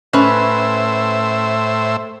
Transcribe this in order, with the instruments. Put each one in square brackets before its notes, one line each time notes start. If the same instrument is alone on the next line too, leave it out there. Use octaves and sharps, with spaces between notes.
[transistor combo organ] A2 C5 E5 [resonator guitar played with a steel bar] C#4 B4